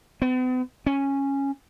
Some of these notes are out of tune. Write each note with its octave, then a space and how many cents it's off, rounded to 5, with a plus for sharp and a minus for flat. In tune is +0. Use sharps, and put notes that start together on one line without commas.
B3 +45
C#4 -10